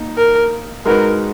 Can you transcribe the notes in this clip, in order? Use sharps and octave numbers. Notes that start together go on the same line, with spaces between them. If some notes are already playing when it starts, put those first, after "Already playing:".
Already playing: A#3 D#4
A#4
G#3 D#4 F#4 A#4 B4